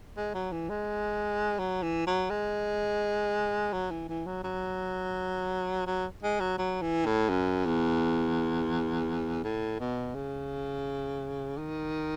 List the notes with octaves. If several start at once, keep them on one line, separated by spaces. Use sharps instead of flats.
G#3
F#3
E3
G#3
F#3
E3
F#3
G#3
F#3
E3
E3
F#3
F#3
F#3
G#3
F#3
F#3
E3
A2
F#2
E2
A2
B2
C#3
D#3